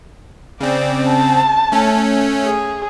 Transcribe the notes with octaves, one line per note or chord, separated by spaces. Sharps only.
C#3 C4 D5
A5
A3 C#4
G#4